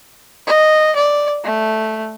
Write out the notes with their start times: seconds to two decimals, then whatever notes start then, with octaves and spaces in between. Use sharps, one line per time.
0.47 D#5
0.95 D5
1.44 A3